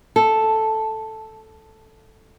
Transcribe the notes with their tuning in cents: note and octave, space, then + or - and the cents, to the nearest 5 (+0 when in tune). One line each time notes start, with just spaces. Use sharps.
A4 +0